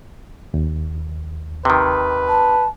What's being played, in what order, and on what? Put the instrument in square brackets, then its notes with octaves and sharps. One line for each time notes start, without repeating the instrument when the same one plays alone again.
[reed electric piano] D#2
[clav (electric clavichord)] C3 D#3 [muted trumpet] B4
[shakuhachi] A5